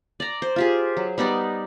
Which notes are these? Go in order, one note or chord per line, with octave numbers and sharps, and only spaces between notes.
D5 A#5
C5
F4 G4 G#4
F#3
G3 B3 D#4 D5